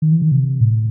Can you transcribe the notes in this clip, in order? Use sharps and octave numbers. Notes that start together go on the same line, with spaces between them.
D#3
E3
D#3
C3
A2